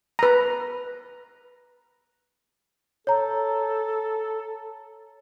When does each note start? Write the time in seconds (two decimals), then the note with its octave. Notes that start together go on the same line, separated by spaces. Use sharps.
0.19 B4 A#5
3.07 A4 C#5 A#5